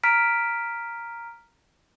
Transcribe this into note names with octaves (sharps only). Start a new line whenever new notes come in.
A#5 F6 B6 D7